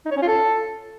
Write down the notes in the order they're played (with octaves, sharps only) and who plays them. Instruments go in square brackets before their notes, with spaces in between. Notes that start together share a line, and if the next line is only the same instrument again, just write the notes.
[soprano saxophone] D#4
C#5
C#4
F4
A4